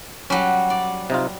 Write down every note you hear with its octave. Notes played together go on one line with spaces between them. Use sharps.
F#3 G3 C#4
D5
C3 D#4 F4